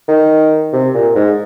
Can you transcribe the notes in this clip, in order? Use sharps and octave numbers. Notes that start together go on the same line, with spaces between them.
D#3
C3
A#2
G#2